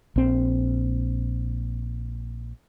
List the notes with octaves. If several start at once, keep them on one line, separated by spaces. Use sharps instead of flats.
A#1 C4